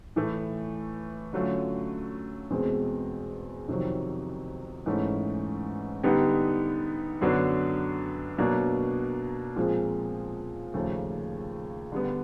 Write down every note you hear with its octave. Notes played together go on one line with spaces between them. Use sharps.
A2 E3 A3
D3 F#3 A3 C#4 F4
E2 B2 G#3 C4
F2 C3 D#3 F#3
G#2 E3 A3 C#4
D3 G3 B3 D#4 G4
F#2 D3 F#3 B3 D4
B2 F#3 A#3 D4
A#2 F3 G#3 C4
D#2 C#3 F3 A3
D3 G3 B3